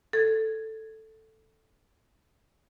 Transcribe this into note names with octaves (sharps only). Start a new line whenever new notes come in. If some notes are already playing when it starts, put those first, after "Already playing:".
A4 G#6